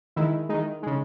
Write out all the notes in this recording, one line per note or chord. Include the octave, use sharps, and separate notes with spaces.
D#3 G#3 E4
G#3 D#4
D#3
C#3 G#3